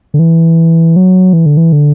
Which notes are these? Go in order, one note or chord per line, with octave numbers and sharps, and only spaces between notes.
D3
E3
F#3
E3
D3
E3
D3